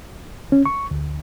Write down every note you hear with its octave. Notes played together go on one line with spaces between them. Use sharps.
C#4
C#6
D2